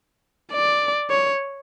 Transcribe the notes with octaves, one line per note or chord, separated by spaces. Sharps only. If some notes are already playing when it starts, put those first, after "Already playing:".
D5
C#5